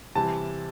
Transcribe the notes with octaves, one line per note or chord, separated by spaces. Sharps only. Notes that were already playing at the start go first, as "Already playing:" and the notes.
C3 E3 G3 A5